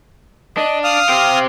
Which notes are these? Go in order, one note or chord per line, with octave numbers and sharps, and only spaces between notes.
D4 D#5
F5 D#6 F6
C4 G4